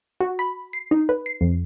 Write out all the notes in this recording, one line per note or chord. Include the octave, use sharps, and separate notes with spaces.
F#4
B5
C7
D#4
B4
C7
F2